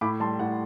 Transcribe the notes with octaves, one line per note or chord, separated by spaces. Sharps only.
A2 B5 D6
G3 A5 C6
A2 F#5